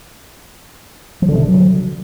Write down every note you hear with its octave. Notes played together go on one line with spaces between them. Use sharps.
F3
D3
C3
D3
F#3